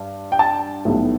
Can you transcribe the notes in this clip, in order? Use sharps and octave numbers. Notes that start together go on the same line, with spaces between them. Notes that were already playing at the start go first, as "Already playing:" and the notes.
Already playing: G2
G5
A5
B1 A2 G3 B3